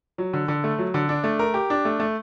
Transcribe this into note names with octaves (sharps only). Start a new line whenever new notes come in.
F#3
D3
D3
A3
F#3
D3
D4
A3
A#4
G4
D4
A3
A3